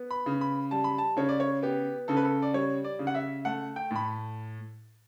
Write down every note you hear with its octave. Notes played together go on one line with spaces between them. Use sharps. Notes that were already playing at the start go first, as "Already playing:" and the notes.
Already playing: B3
B5
C#3
B5
G3 A5
B5
A5
C#3 C#5
D5
C#5
B3 G4
C#3 A4
B4
A4
D5
G3 C#5
D5
C#3
F#5
E5
A3 F#5
G5
A2 B5